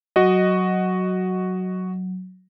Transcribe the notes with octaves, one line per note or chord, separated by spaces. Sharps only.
F#3 F#4 D#5